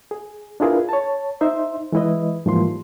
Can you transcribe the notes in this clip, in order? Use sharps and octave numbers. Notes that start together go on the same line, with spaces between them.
G#4
D4 E4 F4 G#4 A#4 B4
C#5 A5
D#4 C5 E5 C6
E3 G#3 E4 B4 D#5
G#2 E3 F3 G3 A#3 C6